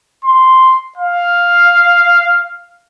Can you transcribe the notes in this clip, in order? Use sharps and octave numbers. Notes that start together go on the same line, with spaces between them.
C6
F5